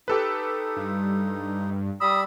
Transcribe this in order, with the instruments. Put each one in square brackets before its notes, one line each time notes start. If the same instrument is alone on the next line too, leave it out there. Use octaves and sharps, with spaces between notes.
[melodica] D#4 [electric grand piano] G4 A4 B4
[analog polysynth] G2
[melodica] G3 B5 E6 [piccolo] D#6